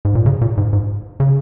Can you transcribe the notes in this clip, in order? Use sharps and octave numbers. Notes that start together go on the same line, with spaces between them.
G#2
A#2
C#3
A#2
G#2
G#2
C#3